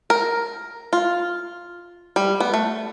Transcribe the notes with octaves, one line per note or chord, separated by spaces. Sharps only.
A#4
F4
G3
B3
A3